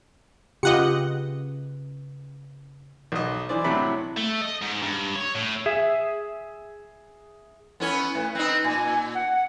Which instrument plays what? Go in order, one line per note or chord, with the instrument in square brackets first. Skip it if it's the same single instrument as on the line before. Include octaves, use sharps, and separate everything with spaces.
[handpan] C#3 B4 [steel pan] F4 G4 [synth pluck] D#5 F#5 C#7
[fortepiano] B1 D#5
E3 C5 D5
A2 C3 F#3 D4 E4 B5
[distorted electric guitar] A3
D#5
G#2
G2
C#5
A2
[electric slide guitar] G#4 E5
[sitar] B3 C#4 C#5 [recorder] E4
[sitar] A2 [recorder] B4
[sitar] C4 D#4
[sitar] A#2 [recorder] G#5
[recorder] F#5